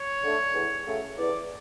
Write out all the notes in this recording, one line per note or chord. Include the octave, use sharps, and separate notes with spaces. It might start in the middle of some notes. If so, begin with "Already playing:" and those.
Already playing: C#5
D3 A3
E2
C#3 F#3 A3
E2 D5